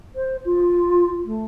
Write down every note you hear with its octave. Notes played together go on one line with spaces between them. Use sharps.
C5
F4
A3